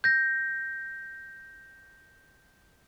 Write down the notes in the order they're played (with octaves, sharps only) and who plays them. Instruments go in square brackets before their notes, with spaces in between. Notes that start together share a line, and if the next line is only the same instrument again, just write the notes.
[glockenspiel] G6 A#6